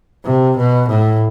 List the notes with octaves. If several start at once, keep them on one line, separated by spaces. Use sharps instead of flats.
C3
B2
A2